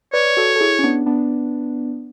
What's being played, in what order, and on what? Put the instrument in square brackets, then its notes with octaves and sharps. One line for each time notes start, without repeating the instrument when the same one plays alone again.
[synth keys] B4 D5 [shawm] C#5
[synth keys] F#4 A4
A4
E4 G#4
C#4
B3 D4
B3 D4